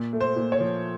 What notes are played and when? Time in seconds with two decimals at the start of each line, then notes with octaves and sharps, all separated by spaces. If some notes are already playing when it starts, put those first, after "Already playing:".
Already playing: A#2
0.13 A3
0.21 C5
0.36 A#2
0.52 C#5
0.60 F3